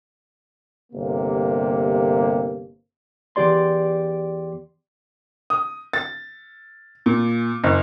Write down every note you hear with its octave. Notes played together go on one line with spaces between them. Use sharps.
G1 C3 A#3
E2 G2 G4 D5 C6
D#6
A6
A#2
F#1